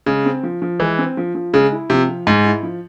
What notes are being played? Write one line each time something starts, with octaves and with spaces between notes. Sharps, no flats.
C#3 G#3
C4
F3
F3
E3 G#3
C4
F3
F3
C#3 G#3
E4
C3 F3
F3
G#2 G#3
E4
F3